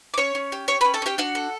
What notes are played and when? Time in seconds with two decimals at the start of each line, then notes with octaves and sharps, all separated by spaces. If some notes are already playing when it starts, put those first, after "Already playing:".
0.14 D6
0.18 C#4 C#5 C#6
0.35 C#4
0.52 G4
0.68 G4 C#5 C#6
0.81 C#4 B4 B5
0.94 A4 A5
1.02 C#4 G4 G5
1.18 D4 F#4 F#5
1.35 A4